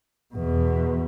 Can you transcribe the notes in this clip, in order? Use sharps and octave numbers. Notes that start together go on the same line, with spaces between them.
E2 B2